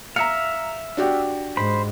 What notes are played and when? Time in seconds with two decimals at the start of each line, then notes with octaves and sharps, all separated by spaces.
0.16 E5 F5 A#5 C#7
0.97 D4 F#4 G4
1.57 G#2 C5 B5